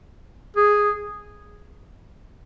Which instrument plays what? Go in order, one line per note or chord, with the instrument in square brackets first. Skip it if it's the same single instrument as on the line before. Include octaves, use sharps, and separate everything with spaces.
[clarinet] G#4